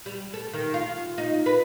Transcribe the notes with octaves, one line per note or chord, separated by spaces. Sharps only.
G3
A4
D#3
F4
D#4
B4